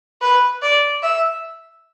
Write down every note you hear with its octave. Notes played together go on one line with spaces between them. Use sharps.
B4
D5
E5